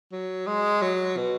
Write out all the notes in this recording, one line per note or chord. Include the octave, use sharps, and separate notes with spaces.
F#3
G#3
F#3
B2